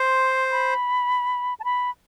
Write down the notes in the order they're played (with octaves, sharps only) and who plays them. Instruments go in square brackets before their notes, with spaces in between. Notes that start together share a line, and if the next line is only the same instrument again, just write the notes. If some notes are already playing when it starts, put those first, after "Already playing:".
Already playing: [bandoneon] C5 [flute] C6
[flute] B5
A5
B5